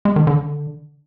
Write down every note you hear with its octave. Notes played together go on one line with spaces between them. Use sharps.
G#3
D#3
D3